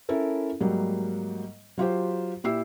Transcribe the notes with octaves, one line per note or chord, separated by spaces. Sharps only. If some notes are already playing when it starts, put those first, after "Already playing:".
C#4 E4 A4 A#4
G#2 F#3 G3 A#3
F#3 F4 G4 C5
A#2 E4 G4 E6 C7